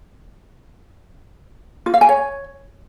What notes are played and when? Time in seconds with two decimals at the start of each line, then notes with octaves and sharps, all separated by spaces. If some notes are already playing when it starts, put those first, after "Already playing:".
1.86 F4
1.94 F5
2.01 G#5
2.09 C#5